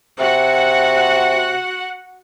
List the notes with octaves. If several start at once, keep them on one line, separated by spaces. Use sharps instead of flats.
C3 F#4 F#5